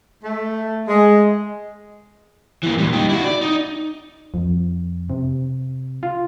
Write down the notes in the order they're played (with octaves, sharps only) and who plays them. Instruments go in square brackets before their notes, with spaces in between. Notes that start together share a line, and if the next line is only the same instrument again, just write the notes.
[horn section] A3
G#3
[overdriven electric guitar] E3 A#3
A#2 G3
D#4 G4
E4 F#4
D5
D#4
[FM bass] F2
C3
F4